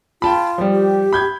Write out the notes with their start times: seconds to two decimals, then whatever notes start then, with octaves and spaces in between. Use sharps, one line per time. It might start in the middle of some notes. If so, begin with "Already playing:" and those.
0.22 F4 G5 A5 B5
0.58 F3 G3
0.72 G4
1.13 B5 G6 G#6